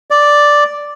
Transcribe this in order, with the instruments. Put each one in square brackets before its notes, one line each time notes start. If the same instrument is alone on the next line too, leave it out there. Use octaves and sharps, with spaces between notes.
[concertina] D5